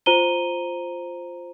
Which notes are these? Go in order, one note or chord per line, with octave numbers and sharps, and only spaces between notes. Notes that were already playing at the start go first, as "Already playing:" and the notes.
F4 C5 A#5 D#7 G7